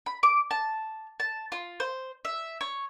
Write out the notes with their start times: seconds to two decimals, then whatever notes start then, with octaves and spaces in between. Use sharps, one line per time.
0.06 B5
0.23 D6
0.51 A5
1.20 A5
1.52 F4
1.80 C5
2.25 E5
2.61 C#5